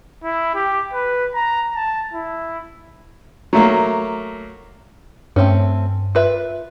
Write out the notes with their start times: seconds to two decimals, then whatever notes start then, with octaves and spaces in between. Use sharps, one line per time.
0.24 E4
0.55 G4
0.93 B4
1.35 A#5
1.76 A5
2.14 E4
3.53 F#3 A3 A#3
5.36 G2 A3 C4 C#4
6.15 F4 B4 E5